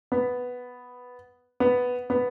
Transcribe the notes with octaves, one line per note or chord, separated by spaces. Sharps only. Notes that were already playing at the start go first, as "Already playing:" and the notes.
B3
B3
B3